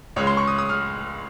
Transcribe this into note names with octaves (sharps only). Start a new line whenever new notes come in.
C#2 C#3 G#3 C#5
C6
C#6
D#6
D#6
F6